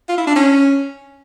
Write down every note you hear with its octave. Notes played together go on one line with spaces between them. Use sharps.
F4
E4
D4
C#4